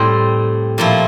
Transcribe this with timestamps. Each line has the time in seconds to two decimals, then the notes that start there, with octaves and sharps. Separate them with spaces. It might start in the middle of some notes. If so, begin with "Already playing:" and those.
Already playing: A2 G3 C4
0.78 A#2 F3 A3 E4